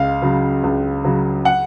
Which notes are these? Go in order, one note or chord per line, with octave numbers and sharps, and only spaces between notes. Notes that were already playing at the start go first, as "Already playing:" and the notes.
Already playing: C#2 F5
C#3 F#3
C#2
C#3 F#3
F#5